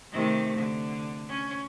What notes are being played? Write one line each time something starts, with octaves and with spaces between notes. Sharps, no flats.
C3 D#3 A3
D3
C#4